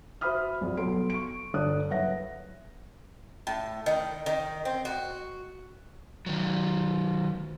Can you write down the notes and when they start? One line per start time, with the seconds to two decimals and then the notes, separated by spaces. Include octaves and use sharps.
0.21 F#4 C5 E5 B5 D#6 F6
0.61 C2 F2
0.77 B1 B2 F#3 A4 C6 D7
1.10 C#6 D7
1.54 G1 D3 D4 D#6 F#6
1.89 F#1 B4 C#5 E5 F#5 A#6
3.47 A2
3.86 D#3
4.26 D#3
4.65 C4
4.85 F#4
6.26 D#3 F#3